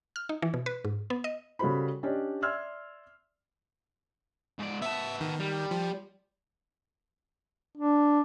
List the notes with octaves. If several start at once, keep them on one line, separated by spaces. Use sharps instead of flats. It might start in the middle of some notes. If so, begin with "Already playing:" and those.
F6
D#4
E3
B2
B4
G#2
B3
D#5
C#3 G3 F#4 A4 C5 B5
C#4 D4 G4 D5 D#5
D5 E5 C6 E6 F6 G#6
G#2 D5
B3 E5 A5
D#3
G3
F3
D4